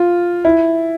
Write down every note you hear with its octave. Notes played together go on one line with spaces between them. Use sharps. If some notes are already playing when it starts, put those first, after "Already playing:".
Already playing: F4
E4